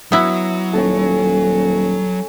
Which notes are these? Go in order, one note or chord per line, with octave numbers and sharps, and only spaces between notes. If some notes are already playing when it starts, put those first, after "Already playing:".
F#3 B3 E4
D#1 C#4 A4